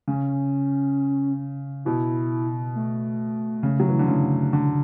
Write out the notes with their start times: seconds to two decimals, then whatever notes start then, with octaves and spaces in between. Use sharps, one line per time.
0.08 C#3 C#4
1.85 B2 E4
2.75 A3
3.63 C#3
3.80 F#3
3.89 E3
3.99 D3
4.08 C#3
4.53 D3